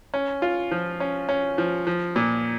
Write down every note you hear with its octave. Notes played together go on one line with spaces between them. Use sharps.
C#4
F4
F3
C#4
C#4
F3
F3
A#2